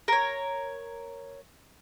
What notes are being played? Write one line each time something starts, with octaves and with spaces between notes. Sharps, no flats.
A#4 C#5